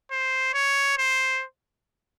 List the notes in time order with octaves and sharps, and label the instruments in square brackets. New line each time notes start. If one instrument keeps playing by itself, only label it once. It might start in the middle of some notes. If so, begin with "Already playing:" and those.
[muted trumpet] C5
C#5
C5